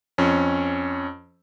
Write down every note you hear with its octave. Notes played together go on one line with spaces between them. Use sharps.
F2 C#4